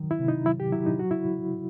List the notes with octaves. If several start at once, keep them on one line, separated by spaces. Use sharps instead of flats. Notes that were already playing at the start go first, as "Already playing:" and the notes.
Already playing: D#3 F#3
E4
C3
D#4
F#3 E4
G4
F#3 E4
D#4
F#3 F#4
E4